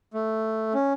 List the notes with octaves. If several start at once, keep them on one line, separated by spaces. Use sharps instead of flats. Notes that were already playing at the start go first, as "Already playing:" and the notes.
A3
C#4